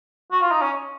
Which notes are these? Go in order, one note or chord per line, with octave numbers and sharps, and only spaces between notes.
F#4
F4
D#4
C#4